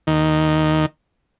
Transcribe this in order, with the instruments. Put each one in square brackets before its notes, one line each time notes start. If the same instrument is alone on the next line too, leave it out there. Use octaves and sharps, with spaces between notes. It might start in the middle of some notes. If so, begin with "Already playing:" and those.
[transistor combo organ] D#2 D#3